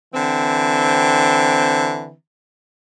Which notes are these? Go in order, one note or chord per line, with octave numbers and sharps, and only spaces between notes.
D3 E3 C4